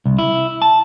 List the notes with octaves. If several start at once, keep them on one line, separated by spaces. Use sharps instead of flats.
C2
E4
A5